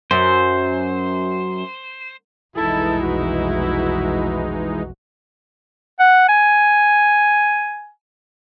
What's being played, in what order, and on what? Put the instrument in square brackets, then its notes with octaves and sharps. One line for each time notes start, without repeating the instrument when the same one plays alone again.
[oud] F#2 [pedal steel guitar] C5
[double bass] F1 B1 [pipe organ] E3 G#3 D#4 [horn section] E4 [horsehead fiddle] A4
[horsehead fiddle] F#4
[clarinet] F#5
G#5